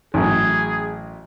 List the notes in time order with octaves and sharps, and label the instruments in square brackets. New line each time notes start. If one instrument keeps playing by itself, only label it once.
[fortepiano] A1 F#2 [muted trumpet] G#4